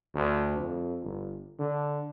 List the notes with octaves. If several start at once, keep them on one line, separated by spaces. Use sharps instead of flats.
D2
F2
G1
D3